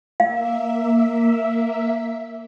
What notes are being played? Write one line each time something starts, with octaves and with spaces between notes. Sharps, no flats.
A#3 E5 F5